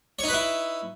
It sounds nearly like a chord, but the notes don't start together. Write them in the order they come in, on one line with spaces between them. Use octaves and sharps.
C#5 D#4 B4 E4